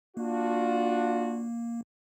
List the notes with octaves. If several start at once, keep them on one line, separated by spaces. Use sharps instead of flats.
A#3 D4 F4 F#4